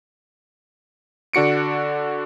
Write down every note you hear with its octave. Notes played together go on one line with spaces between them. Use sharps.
D3 D4 F#4 C#7 D7